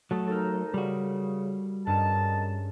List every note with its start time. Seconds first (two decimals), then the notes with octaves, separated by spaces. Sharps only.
0.11 F#3 A3 A5 D#6
0.27 D#2 D#4 A4 A#4
0.74 C#3 G3 F#4
1.87 G2 G#3 C#4 A#4 D#5 A5